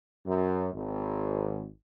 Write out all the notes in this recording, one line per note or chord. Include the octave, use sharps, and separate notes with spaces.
F#2
G#1